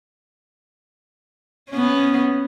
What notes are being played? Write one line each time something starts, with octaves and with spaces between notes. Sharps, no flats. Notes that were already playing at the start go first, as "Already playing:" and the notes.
B3 C#4